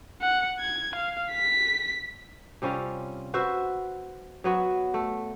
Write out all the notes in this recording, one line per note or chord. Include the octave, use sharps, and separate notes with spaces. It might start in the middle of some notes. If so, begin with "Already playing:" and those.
F#5
G#6
F5
B6
C3 G3 C#4 F4
F#4 B4 C5 E5
F#3 B3 F#4
A3